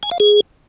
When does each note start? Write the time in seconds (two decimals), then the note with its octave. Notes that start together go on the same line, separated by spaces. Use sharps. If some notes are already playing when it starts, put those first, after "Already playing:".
0.03 G#5
0.11 F5
0.20 G#4